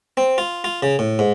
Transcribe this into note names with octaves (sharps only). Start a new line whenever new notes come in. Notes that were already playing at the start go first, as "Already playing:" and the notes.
C4
F4
F4
C#3
A2
G#2